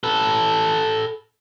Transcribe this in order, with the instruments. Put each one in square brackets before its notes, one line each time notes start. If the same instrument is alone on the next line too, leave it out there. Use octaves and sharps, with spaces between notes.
[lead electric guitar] A4 B4